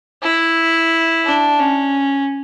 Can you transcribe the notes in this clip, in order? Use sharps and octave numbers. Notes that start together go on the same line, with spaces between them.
E4
D4
C#4